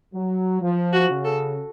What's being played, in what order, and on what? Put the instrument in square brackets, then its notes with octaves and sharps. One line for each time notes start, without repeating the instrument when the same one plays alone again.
[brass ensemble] F#3
F3
[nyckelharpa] F#4
[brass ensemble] C#3
[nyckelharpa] A4